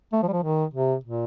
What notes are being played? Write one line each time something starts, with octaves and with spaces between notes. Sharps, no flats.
A3
F3
G3
F3
D#3
C3
A#2